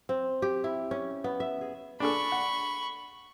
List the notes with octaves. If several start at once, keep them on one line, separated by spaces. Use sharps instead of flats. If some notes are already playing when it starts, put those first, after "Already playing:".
C4
G4
E4
C#4
B3
E5
G#4
D4 G#4 A4 B5 C#6
F#5